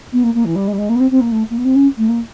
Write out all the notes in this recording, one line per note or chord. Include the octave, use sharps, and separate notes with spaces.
B3
A#3
A#3
E3
G3
G#3
G3
G#3
A#3
B3
C4
C4
A#3
A3
A#3
B3
C4
C#4
A3
A#3